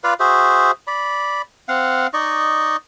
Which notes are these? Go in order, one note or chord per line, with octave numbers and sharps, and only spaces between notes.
F4 B4 D5 F5
F#4 G#4 C5 E5
D5 B5
C4 F5 F#5
D#4 D5 D#5 C#6